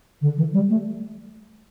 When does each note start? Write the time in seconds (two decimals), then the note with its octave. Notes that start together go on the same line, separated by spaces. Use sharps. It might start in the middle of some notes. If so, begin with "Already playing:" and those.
0.21 D3
0.37 E3
0.53 G3
0.70 A3